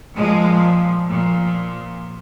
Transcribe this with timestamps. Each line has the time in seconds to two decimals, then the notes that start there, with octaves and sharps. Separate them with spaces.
0.16 A#2 F3 G#3
1.07 A#2 F3